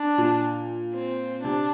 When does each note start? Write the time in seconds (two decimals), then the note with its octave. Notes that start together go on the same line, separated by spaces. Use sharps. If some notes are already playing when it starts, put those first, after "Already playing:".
Already playing: D4
0.18 A#2
0.94 C4
1.44 C3 D4